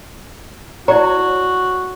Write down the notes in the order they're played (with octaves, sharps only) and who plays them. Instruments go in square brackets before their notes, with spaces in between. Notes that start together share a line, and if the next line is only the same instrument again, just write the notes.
[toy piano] E4 D5 A#5 [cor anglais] F#4 [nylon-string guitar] C#5